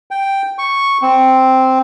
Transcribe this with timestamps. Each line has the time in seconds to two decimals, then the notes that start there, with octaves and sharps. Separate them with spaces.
0.11 G5
0.58 C#6
1.02 C4